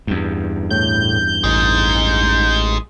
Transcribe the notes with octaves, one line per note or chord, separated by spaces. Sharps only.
E2 G2
A2 G6
A1 G#3 D#4